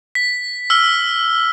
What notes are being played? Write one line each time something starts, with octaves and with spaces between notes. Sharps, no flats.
B6
E6 F6 G7